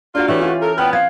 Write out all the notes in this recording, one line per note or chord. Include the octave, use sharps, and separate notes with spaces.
A#3 D4 F4 F#4
E3 A3 C#4 E4 G4 B4
F4 F#4
A4 A#4
A#2 B3 G5 B5 F6 F#6
C4 F5 G#6